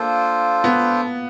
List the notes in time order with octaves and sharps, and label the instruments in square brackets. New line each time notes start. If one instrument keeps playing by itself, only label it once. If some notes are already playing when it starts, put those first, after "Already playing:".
Already playing: [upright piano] A#3 [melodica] D4 F4 A4 C5
[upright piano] B3